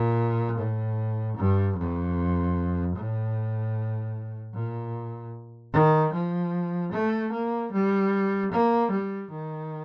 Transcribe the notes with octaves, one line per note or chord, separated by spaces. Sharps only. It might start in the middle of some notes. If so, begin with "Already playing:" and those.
Already playing: A#2
A2
G2
F2
A2
A#2
D#3
F3
A3
A#3
G3
A#3
G3
D#3